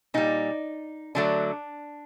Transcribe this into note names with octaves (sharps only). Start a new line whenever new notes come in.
A#2 G3 D#4
D3 F#3 A3 D4